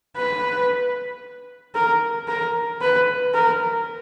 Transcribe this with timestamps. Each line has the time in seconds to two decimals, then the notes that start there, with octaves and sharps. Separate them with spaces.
0.17 B4
1.75 A#4
2.28 A#4
2.82 B4
3.34 A#4